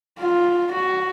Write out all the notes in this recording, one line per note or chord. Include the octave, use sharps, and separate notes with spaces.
F4
F#4